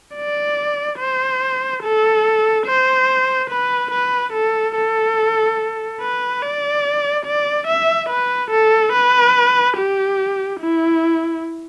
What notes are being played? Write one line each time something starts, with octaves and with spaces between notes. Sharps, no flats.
D5
C5
A4
C5
B4
B4
A4
A4
B4
D5
D5
E5
B4
A4
B4
G4
E4